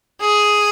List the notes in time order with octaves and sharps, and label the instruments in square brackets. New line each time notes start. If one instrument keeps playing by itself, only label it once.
[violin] G#4